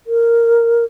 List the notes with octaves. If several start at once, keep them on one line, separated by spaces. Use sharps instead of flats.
A#4